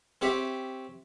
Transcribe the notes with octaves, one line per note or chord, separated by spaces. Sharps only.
C4 G4 C#5 E5